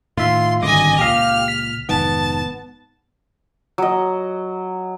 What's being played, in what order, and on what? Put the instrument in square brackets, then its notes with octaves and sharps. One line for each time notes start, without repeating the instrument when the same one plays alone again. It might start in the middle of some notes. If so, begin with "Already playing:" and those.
[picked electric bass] A2 D#3 [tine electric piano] F4 E5 [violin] C6
[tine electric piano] G#1 D6 [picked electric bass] G2 D3 [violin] D#5 G#5
[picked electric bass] C#2 A#2 [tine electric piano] G4 F5 [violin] F6
[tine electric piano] B6
[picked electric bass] F1 G#2 D#3 [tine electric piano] B3 [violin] A5
[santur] F#3 D#5